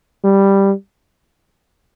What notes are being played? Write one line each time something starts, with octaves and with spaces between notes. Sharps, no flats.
G3